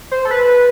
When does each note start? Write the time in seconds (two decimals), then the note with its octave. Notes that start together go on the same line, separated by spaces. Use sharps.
0.11 C5
0.25 A4
0.31 B4